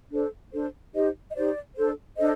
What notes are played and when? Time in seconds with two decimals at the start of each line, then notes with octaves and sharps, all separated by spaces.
0.11 D4 A4 C5
0.52 D4 A4 C5
0.94 D#4 G4 C5 D#5
1.28 D#5
1.35 D#4 G4 C5 D5
1.76 D4 A4 C5
2.18 D4 A4 C5 D#5